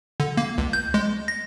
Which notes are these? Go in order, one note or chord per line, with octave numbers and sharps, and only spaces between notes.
D3
A#3
C#2
G6
G#3
A#6